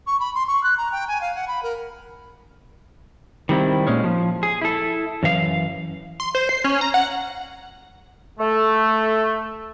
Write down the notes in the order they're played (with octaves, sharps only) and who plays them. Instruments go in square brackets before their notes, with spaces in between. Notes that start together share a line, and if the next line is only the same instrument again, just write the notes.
[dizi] C#6
B5
C6
C#6
F#6
A#5
G5
G#5
F5
F#5
B5
A#4
[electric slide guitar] D#3 G3 C4 E4
A#2 G#3 C#4
F3
G#4
E4 A4
F#2 E3 F5
[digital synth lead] C6
C5
C7
C#4
A#5
F#5
[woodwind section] A3